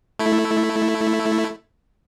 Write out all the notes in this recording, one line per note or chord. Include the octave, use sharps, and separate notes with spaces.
A3 E4